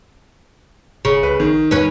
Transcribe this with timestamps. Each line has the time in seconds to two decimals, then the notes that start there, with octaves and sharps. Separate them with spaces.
1.05 E1 C#3
1.23 C2 B4
1.40 A#1 D#3
1.71 E2 C#4 B4